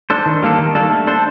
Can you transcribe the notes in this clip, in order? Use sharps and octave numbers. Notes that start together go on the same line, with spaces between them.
D4 A4 C5
D#3
G3 A#3 D4 A4
D#3
G3 A#3 D4 A4
A3
D4 A4 C5